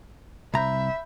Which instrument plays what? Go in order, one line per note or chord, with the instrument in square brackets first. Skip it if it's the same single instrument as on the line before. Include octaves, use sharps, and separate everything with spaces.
[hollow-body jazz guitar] C2 A#5 [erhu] E5 [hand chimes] B5 G6